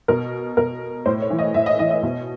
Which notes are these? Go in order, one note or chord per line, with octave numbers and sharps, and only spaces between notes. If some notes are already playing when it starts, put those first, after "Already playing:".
B2 A#4
B2 A#4
A2 C5
C#5
E3
D#5
A2 E5
D#5
E3 D#5
D#5
B2